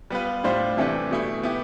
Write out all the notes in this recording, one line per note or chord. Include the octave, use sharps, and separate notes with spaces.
G3 B3 F4 B4
A2 G3 D4 F4 C5
C3 E3 A3 D4 G4
B2 A3 E4
B3 E4 G4